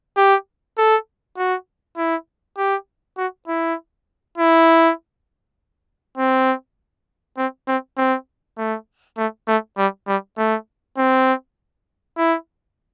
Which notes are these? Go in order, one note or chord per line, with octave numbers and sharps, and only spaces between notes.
G4
A4
F#4
E4
G4
F#4
E4
E4
C4
C4
C4
C4
A3
A3
A3
G3
G3
A3
C4
E4